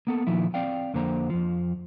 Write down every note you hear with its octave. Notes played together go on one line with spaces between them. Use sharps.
A#3 B3 A4
A#2 D#3 F3 E4
C4 D5 F5 G5
F2 D3 A#3 C5 A#5
F2 F3